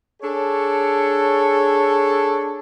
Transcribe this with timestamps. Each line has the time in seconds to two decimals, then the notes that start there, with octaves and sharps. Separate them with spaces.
0.21 D4 G#4 A4 C#5